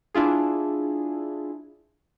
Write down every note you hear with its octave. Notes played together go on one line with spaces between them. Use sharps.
D4 E4 F4 G#4